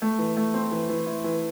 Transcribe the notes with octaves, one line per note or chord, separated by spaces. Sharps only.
A3
E3
A3
C4
E3
E3
E4
E3